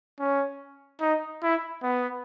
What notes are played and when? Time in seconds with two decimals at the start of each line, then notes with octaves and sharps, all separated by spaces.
0.19 C#4
1.00 D#4
1.43 E4
1.83 B3